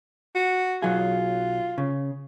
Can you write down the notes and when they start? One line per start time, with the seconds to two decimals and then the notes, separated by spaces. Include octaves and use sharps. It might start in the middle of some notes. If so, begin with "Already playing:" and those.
0.35 F#4
0.82 B1 F#3 F4 G#4
1.78 C#3